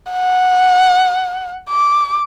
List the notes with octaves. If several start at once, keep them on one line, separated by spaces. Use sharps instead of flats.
F#5
D6